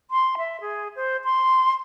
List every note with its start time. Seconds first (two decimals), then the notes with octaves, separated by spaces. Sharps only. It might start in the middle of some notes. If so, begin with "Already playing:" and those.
0.11 C6
0.38 E5
0.61 G#4
0.96 C5
1.24 C6